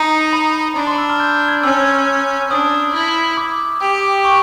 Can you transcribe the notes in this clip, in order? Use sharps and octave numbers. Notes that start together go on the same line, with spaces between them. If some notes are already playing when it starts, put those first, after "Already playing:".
Already playing: D#4 A#5
B5
D4 B5
C6
E6
F6
G6
G#6
C#4 E6
D4 D#6
E4
D6
G4
C#6